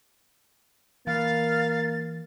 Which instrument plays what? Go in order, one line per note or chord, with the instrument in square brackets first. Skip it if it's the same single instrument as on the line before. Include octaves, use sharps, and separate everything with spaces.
[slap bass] E3 [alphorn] A#3 [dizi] F5 [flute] A6